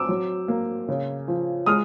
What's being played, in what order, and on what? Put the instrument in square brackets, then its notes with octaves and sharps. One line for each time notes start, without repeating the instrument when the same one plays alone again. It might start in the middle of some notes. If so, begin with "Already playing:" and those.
Already playing: [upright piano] C4 D6 E6
F#3
A#3
C#3
F3
G#3 D#6 F6